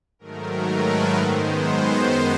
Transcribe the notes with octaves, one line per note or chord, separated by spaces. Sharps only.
G#2 D#3 F#3 A3 A#4
B4
F#2 D#3 G#3 B3 C5